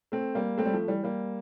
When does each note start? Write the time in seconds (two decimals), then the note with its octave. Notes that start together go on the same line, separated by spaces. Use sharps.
0.12 A3 C4
0.35 G3 A#3
0.58 A3 C4
0.66 G3
0.74 F3 A3
0.88 E3 G3
1.04 G3 A#3